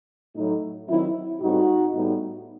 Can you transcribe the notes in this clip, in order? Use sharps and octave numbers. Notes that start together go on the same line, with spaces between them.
A2 F#3 A3 D#4
D#3 F#3 C4 E4
A2 G3 C4 D#4 F#4
A2 G3 B3 D#4